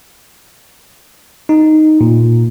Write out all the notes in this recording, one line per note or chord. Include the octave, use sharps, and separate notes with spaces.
D#4
A#2